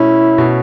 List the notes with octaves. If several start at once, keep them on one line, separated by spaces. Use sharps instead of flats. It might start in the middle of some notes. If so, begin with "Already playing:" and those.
Already playing: B2 A3 C#4 E4
B2